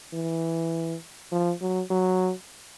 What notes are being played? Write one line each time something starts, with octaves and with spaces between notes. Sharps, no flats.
E3
F3
F#3
F#3